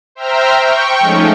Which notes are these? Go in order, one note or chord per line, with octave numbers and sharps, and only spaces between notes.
C5 E5 G5 A#5 F6
G5 C#6
F3 G#3 A3 C#4 D#4